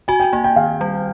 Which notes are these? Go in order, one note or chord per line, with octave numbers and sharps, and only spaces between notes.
F#4 G#5
G5
A#3 G#5
G5
D#3 F5
G3